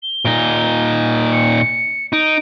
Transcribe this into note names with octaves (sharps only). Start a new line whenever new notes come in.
G7
A#2 D#4
C#7
D#4 D7